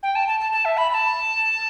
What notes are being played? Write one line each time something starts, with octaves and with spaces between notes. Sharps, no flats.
G5
A5
A5
A5
A5
E5
B5
B5
A5